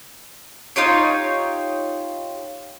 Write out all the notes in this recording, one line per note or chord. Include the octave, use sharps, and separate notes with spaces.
D#4 F4 G4 C#5